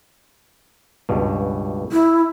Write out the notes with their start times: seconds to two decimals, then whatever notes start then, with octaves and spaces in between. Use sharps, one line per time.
1.09 C#2 G2 B2
1.92 E4